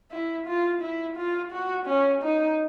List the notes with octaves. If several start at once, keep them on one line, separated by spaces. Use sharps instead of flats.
E4
F4
E4
F4
F#4
C#4
D#4